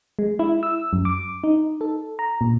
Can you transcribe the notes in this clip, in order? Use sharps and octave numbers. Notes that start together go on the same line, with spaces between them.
G#3
E4
E6
F#2
D6
D#4
A4
A#5
A#2